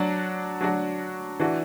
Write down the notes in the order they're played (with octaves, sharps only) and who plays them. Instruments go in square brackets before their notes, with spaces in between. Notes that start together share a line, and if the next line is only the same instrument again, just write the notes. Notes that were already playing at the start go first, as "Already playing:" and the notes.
Already playing: [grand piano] F#3 D4 F#4
F#3 D4 F#4
E3 D4 F#4